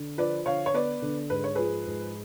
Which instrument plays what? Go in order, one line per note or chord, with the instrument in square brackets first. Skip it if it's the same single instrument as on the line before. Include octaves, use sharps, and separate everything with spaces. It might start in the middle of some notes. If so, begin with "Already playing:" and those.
Already playing: [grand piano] D3
[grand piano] F3 [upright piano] B4 D5
[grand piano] D3 [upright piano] C#5 F5
[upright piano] C#5
[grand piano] B3 [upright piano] B4 D5
[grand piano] D3
[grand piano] G#2 [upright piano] B4
[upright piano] C#5
[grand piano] F3 [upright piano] G#4 B4
[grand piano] G#2